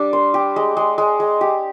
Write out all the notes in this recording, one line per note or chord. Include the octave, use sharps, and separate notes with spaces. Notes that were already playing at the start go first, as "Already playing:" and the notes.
Already playing: G3 D4
C5
G4
G#3
G#3
G#3
G#3
G4